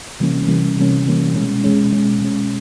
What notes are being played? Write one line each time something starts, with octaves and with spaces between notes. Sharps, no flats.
C3 E3 G3 A#3 C#4
C3 E3 G3 A#3 C#4
C3 E3 G3 A#3 C#4
C3 E3 G3 A#3 C#4
B2 G#3 C#4
B2 G#3 C#4
B2 G#3 C#4
B2 G#3 C#4